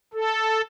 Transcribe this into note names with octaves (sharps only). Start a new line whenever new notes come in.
A4